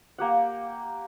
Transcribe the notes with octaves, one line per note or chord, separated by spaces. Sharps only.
A#3 G4 F#5